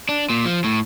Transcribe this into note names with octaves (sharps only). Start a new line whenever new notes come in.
D4
A#2
F3
A2